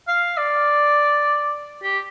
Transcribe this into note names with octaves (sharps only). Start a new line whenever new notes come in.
F5
D5
G4